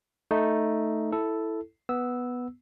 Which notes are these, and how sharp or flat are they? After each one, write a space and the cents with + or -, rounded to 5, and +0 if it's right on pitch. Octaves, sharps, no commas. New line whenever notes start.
A3 +0 D#4 +0
E4 -5 A4 +0
B3 +0 E6 -10